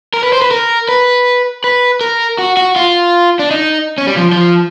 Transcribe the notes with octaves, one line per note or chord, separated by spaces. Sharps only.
A#4
B4
C5
B4
A#4
B4
B4
A#4
F#4
F#4
F4
D4
D#4
C#4
G3
F3
F3